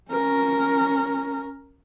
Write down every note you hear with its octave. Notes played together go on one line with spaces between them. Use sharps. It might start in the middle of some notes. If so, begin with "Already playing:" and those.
C#4 A#4